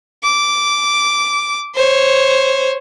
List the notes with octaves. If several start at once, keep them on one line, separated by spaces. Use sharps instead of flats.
D6
C5 C#5